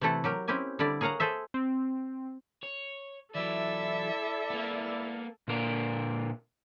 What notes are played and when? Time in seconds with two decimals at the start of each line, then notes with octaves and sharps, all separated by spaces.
0.01 C3 E3 A3 E4 A4 F#5
0.24 F#3 G4 A#4
0.48 C4 C#4 E4 G4 G#5
0.79 D3 G3 E4 D5
1.01 G#4 A#4 C#5 F5 F#5 A#5
1.20 G#4 A4 C5 E5
1.54 C4
2.63 C#5
3.35 E3 F#3 E4 A4 D5 E5
4.50 A#3 B3
5.48 A#2 D3 A#3 A#4